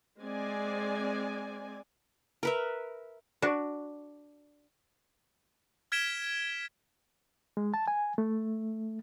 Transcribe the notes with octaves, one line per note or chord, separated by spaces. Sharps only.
G#3 C4 D5 G#5
A#4 B4 E5
D4 F#4
F6 G#6 B6 D7 E7 G7
G#3
A5
G#5
A3